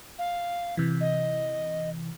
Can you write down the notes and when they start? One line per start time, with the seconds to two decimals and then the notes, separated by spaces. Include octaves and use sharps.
0.19 F5
0.77 C3 E3
1.01 D#5